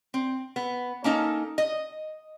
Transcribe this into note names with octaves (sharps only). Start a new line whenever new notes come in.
C4
B3
A#3 C#4 D#4 A4
D#5